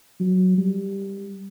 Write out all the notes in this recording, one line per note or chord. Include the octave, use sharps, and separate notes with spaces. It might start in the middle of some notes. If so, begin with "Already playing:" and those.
F#3
G3